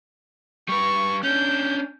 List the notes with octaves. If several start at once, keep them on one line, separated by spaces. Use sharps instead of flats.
G3 B4 C#6
C#4 D4 G6